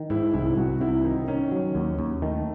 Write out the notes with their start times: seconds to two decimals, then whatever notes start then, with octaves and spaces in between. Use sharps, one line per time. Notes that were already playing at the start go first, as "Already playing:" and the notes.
Already playing: D#3
0.10 G#2 E4
0.33 C2 E4
0.57 C2 F#4
0.81 C3 E4
1.04 D#3 D#4
1.28 D#3 C#4
1.51 F#3
1.75 D#2
1.99 D#2
2.22 D#3 A3